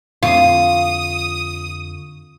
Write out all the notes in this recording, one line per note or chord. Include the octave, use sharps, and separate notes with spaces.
F2 D3 F4 C#6 D#6